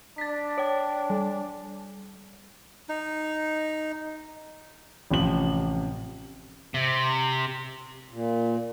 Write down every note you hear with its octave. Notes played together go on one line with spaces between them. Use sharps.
D4 A6 B6
C#5 G5
G3
D#4
A1 C3 F3 F#7
C3
A#2